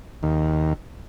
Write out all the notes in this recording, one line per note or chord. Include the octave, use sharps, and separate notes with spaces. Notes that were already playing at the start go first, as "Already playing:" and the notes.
D#2